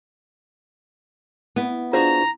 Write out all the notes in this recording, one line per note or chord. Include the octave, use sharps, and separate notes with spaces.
B3 E4
D4 F4 F#4 G#4 C5 A#5